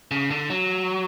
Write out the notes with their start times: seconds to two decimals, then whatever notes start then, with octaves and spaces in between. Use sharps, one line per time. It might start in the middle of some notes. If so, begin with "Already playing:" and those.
0.11 C#3
0.31 D3
0.50 F#3